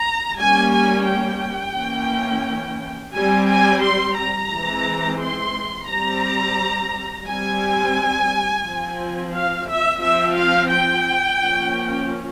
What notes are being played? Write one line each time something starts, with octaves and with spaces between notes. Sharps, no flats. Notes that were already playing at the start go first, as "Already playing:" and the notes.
Already playing: A#5
G3 A#3 C#4 G#5
G#5
G5
E3 A#3 C#4
G3 C4 G#5
G#5
C6
A#5
E3 G#3 C4
C6
G3 C4 A#5
G3 C4 G#5
F3 C4
F5
E5
F3 C4 E5
F5
G5
F3 A#3 C#4